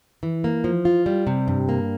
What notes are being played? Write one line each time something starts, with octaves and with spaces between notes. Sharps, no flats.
E3
A#3
F3
F4
G3
C3
G2
A#3